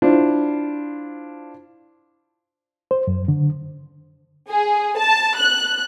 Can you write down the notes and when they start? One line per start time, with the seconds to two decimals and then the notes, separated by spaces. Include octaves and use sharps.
0.02 D4 E4 F4 C5
2.91 C5
3.07 F#2
3.28 D3
4.50 G#4
4.99 A5
5.38 F#6